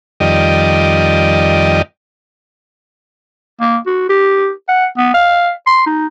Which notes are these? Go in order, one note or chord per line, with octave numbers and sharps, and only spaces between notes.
F2 D#3 G3 D5 D#5
A#3
F#4
G4
F#5
B3
F5
C6
D#4